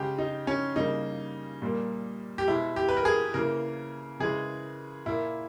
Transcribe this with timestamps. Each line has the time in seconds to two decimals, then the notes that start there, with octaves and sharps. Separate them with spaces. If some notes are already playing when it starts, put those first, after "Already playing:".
Already playing: C#3 G#3 G4
0.18 D#4
0.47 C#4
0.76 C#3 G3 A#3 D#4
1.62 A#2 G3 A#3
2.38 G4
2.48 B2 G#3 E4
2.76 G4
2.89 B4
2.97 A#4
3.05 G#4
3.34 C#3 E3 A#3 A#4
4.20 C#3 E3 G#3 G#4
5.06 A#2 A#3 E4